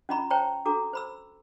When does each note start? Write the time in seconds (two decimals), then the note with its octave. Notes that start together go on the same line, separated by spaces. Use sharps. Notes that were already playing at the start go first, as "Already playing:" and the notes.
0.09 C#4 F4 D#5 A#5 B5 C#6
0.30 C5 C#5 G5 A5 A#5 C#6
0.65 D4 F#4 A4 A#5 D6
0.93 C5 B5 E6